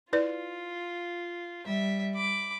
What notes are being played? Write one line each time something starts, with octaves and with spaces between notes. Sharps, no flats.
E4 F4 B4 D5
G3 E5
B5 D6